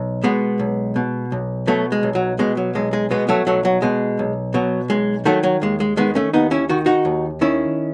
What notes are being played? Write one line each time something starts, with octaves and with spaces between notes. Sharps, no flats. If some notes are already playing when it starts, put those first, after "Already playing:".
Already playing: B1
B2 G#3 B3
B1
B2
B1
B2 F#3 A3
G#3
B1
F#3
B2 G#3
F#3
B1 G#3
G#3
B2 G#3 B3
F#3 A3
B1 F#3 A3
F#3
B2 G#3
B1
B2 F#3
B1 G#3
D#3 F#3 A3
F#3
D#2 G#3
G#3
D#3 G#3 B3
A3 C#4
D#2 B3 D#4
C#4 E4
D#3 F#4
D#4 F#4
D#2
D#3 C#4 E4